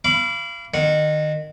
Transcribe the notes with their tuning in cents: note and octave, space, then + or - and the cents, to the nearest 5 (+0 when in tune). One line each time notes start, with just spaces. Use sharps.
F5 -35 B5 +0 D6 -25
D#3 -25 F#5 -20